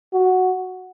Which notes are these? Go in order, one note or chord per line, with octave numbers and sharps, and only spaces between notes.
F#4